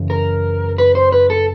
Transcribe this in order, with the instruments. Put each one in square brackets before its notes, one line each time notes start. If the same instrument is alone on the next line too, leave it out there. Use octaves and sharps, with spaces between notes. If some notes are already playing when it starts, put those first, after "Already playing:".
Already playing: [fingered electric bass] F#2 C#3 E3
[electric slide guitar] A#4
B4
C5
B4
A4